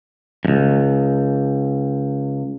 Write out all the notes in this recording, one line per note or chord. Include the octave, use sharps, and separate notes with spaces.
C#2 G2